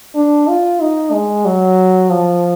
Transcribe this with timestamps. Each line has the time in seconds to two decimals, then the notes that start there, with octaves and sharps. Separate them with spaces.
0.15 D4
0.48 F4
0.81 D#4
1.12 G#3
1.45 F#3
2.10 F3